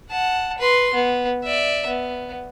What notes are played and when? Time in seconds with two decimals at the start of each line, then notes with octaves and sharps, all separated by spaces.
0.11 F#5 A5
0.58 B4 C6
0.94 B3
1.44 D5 E5
1.87 B3